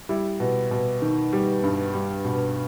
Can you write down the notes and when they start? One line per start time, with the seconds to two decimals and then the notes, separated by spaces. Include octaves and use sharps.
0.09 G3 E4
0.40 B2
0.71 B2
1.02 D#3
1.33 G3
1.63 G2
1.94 G3
2.25 B2